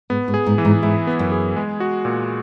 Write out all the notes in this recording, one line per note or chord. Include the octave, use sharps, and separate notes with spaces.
G#2 B3
G#2
G#4
G#2
E3
G#2
G#2 E4
B3
F#2
G#4
G#3
F#4
A#2